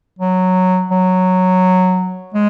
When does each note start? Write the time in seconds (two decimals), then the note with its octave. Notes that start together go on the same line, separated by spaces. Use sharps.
0.19 F#3
0.91 F#3
2.34 G#3